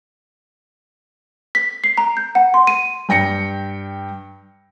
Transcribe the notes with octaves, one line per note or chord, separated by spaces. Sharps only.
B6
C7
A#5
G6
F#5
C6
D#7
G2 G5 A#6 C#7